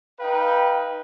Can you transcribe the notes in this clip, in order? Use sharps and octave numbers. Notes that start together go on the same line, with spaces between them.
D#4 B4 F5 G5